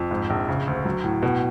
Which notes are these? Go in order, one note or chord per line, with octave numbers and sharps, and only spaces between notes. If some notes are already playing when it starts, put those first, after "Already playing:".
Already playing: F2
G#2
A#1
C#3
D2
F#3
A2
B2